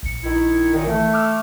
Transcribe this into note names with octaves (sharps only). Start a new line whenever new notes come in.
A#1 C#7
D#3 E4
F#2 A#2 D#3
E3 A3
D6 E6 F6